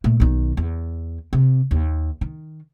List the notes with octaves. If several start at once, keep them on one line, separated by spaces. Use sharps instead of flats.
A#2 A3
B1 D#3
E2
C3
D#2
D#3